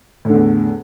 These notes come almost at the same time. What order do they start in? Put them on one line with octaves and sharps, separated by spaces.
A2 D3 E2